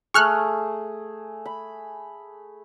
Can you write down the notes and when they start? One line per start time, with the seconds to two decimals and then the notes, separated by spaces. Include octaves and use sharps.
0.14 A3 G#4 C#6 F6 F#6
1.46 B5